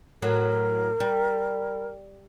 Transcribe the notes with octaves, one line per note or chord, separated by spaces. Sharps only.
A2 F#3 A#4
G3